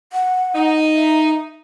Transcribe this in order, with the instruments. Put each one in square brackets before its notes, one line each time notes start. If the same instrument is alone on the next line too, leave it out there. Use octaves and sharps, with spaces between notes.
[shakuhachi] F#5
[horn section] D#4
[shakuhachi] E5